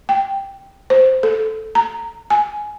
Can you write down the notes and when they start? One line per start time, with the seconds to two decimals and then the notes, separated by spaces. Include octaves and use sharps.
0.09 G5
0.90 C5
1.23 A4
1.75 A#5
2.30 G#5